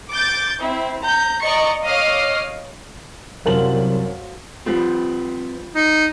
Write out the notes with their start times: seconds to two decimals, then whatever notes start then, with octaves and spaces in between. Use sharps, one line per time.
0.11 D6 G6 A6
0.61 C4 E4
1.04 A#5 G6
1.42 D5 D#5 A#5 C#6 C#7
1.85 C#5 D#5 F5 D6 D#6 F6
3.46 C2 F#2 F#4 A#4 C5 F5 A5 F#7
4.66 F3 G3 C4 B4
5.75 D#4